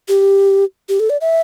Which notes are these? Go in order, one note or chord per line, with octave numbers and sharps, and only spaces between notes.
G4
G4
A4
D5
E5